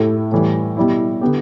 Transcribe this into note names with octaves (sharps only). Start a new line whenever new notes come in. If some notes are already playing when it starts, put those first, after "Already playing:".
Already playing: A2 A3 E4 G4
A2 E3 G3
B2 G3 E4
D3 B3 G4